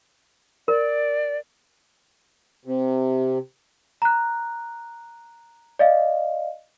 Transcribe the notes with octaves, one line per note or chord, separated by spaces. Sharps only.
A#4 D5
C3
A#5 F#6
D5 D#5 F5